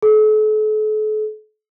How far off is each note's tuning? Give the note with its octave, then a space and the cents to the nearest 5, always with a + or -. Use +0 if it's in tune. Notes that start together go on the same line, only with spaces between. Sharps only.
A4 -40